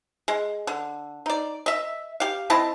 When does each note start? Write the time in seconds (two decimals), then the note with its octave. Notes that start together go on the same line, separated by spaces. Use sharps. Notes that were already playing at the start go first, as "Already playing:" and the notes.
0.28 G#3
0.67 D3
1.26 D#4 D5
1.66 D#5 E5
2.20 G4 F5
2.50 C4 E4 D#5 A5